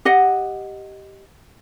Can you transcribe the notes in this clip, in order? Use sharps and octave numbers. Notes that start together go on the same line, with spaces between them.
G4 D#5 F#5